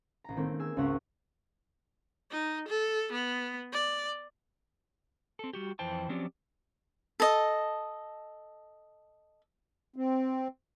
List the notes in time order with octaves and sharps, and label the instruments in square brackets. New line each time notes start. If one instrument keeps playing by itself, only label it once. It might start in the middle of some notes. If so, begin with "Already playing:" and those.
[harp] A1 A#5
D#3 A3 A#3 C4
G#4 G#5 E6
G#1 C#2 C4 C#4 C#5 F#5
[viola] D#4
A4
B3
D5
[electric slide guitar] C4 A4
G3 F#4 G4
F2 E3 C5 G5 A5
F3 F#3 C4 C#4 G4 D5
[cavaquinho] A4 D#5
[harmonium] C4